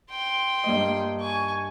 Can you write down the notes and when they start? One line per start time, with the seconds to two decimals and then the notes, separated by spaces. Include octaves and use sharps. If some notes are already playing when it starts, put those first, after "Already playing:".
0.10 G5 C6
0.64 G2 A#3 D#5
1.21 G#5 C#6